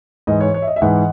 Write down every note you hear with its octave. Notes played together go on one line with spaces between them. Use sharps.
G#2 E3 D#5
C#5
C#5
E5
D#5
E5
G#2 E3 D#5 F#5